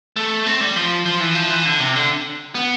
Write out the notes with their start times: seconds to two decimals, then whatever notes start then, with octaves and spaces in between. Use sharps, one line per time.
0.16 A3
0.46 C4
0.61 G3
0.76 F3
1.06 F3
1.21 E3
1.35 F3
1.50 E3
1.65 D3
1.80 C3
1.96 D3
2.55 B3